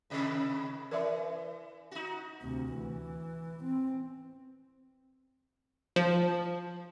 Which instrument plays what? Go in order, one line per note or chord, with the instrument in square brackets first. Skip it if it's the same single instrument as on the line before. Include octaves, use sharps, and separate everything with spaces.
[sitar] A2 C3 D#3
[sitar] E3 [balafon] A#4 D5 E5
[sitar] D#4 F#4
[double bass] D2 C3
E3
C4
[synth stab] F3